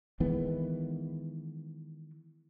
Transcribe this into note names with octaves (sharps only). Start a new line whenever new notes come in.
D#3 E3 G#3 B3